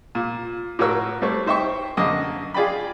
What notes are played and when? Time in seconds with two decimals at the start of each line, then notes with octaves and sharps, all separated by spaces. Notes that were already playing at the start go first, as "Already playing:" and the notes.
0.15 A#2
0.79 A2 F4 F#4 A#4 C#5 E6
1.22 G3 A3 C4 C#5
1.46 D#4 C5 E5 G5 C#6
1.97 F#2 D3 A#3 D4 D#5
2.54 F4 G#4 D5 G5 B5